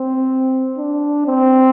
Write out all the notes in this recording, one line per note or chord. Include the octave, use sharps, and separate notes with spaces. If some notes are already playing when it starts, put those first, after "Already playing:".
Already playing: C4
D4
C4